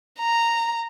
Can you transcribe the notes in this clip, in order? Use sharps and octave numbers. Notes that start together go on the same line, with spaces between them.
A#5